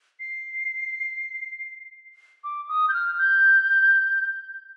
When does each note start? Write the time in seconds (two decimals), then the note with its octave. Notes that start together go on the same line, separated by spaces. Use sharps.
0.20 C7
2.44 D6
2.69 D#6
2.89 G6
2.93 F6
3.18 G6